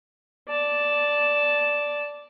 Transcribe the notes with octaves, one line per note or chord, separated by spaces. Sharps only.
D5 A5